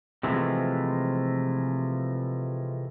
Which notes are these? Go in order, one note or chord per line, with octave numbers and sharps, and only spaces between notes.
C3 E3 F3 G#3 A3